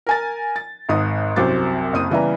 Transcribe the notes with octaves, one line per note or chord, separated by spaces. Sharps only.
A#4 G#5 A6
A6
G#1 G#2 D#6
C2 F#2 F#3 C5 D6 A6
F#1 C4 D#6 D#7
C#3 E3 G3 B3 E5 A#5